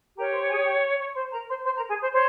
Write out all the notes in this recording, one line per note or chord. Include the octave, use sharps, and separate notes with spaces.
G4 A#4 C#5 A#5
C5 C6
G#4 G#5
G4 G5
C#5 C#6
C5 C6
A#4 A#5
C5 C6
C5 C6
A#4 A#5
G#4 G#5
C5 C6
C5 C#5 C6